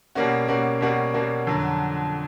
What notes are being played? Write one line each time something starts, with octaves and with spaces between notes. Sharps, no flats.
B2 G3 A#3 C#4 F#4
B2 G3 A#3 C#4 F#4
B2 G3 A#3 C#4 F#4
B2 G3 A#3 C#4 F#4
F2 D3 F#3